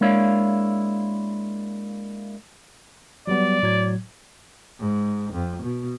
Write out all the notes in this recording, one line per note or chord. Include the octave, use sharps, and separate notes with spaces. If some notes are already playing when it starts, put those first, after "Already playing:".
G#3 A#3 D4 E4 C#5 F5
F#3 G3 B3 D5
A2 F#3 G#6
G#2
F2
B2